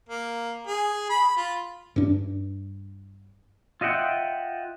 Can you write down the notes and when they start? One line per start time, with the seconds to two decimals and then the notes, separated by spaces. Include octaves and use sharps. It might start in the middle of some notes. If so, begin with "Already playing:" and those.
0.09 A#3
0.67 G#4
1.10 B5
1.37 F4
1.96 G2 D4
3.81 F4 D#5 E5 F#5 G5